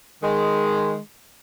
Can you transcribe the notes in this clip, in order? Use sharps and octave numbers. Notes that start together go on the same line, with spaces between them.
D#3 G#3